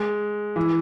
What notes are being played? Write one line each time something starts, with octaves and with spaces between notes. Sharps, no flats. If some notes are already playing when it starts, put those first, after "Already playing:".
Already playing: G#3
E3